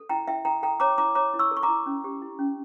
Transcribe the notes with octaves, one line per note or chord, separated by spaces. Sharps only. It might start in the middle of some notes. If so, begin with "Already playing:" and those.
Already playing: A4
E4 G5 A#5
E4 E5 G5
A4 G5 A#5
A4 G5 A#5
C#5 A#5 D6
E4 A#5 D6
C#5 A#5 D6
E4
C#6 E6
A4
C#6
A#5 D6
E4
C#4
G4
E4
C#4